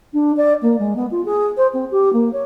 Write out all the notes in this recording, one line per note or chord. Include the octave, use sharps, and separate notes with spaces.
D4
D5
A#3
G#3
B3
F4
G#4
C5
C4
G4
A#3
C#5